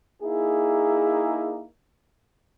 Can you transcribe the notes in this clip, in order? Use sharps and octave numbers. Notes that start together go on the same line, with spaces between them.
A#3 D#4 E4 G#4